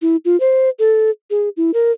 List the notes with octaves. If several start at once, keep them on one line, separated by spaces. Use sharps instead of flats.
E4
F4
C5
A4
G#4
E4
A#4